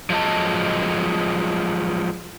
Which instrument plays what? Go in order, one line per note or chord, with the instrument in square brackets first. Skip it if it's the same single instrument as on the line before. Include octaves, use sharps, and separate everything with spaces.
[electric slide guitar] F3 F#3 G#3 D#5 A5